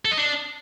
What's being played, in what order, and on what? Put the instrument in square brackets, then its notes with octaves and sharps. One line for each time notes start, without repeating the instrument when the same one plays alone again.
[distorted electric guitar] A4
D#5
D4